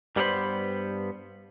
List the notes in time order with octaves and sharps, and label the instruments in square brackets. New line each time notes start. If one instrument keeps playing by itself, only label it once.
[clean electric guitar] G2 G3 B3 G4 C5 B5